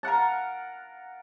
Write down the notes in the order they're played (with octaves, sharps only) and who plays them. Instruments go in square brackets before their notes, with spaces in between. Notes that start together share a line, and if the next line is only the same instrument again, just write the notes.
[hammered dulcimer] A#4 F5 F#5 A5